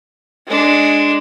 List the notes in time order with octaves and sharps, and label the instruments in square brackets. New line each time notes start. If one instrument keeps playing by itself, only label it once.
[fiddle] G#3 D4